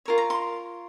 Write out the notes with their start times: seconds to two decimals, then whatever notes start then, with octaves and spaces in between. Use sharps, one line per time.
0.05 F4 A#4 C#5
0.18 A#5
0.30 C6